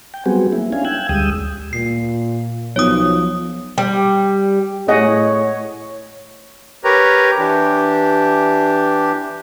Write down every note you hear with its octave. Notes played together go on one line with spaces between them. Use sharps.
G5
F#3 G3 B3 C4 F#4 G#4
A#3 E4
C#4 D4 E4 F5 G#5
G5 E6 F#6 G#6
D2 G3 G#3 G5 D#6 E6
A#2 C7
B1 F3 C#5 D#6
G3
A2 G#4 C#5 D#5 F#5
G4 A#4 B4 C#5 A#5
E3 D4 G4